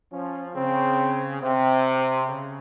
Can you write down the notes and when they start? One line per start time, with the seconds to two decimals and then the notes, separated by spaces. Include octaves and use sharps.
0.12 F3 C#4
0.55 C#3 C4
1.41 C3 C4
2.28 C#3